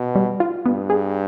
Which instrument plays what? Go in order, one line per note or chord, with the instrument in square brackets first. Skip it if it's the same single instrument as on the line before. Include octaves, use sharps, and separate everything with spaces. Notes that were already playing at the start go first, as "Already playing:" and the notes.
Already playing: [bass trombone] B2
[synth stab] G3
F4
[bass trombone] G2 [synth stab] B3
[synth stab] G#4